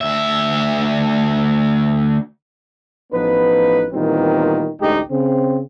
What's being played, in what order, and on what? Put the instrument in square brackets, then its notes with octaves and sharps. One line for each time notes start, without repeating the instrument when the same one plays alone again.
[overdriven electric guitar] D2 E5
[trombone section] A1 F3 B3 D#4 B4
A#2 D#3 E3 G3 B3 C4
A1 D2 G#3 D#4 G4
C#3 C4